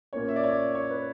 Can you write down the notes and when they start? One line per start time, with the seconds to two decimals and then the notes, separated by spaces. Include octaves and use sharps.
0.13 A#2 A#3 C#4 C#5
0.28 E5
0.36 D5
0.43 C#5
0.51 D5
0.75 C#5
0.90 B4